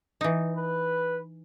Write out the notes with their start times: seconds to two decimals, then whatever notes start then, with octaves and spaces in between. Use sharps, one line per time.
0.21 E3 D#4
0.56 B4